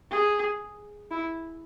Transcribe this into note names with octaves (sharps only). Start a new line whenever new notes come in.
G#4
E4